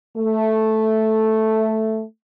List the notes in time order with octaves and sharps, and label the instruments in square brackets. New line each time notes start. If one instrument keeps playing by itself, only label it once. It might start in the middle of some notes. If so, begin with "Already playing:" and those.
[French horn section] A3